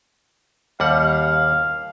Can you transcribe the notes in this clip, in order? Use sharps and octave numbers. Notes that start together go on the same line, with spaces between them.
D#2 G3 F5 F#5